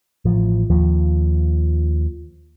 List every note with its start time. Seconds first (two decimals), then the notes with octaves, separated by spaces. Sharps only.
0.25 A1 F3
0.70 D#2 F3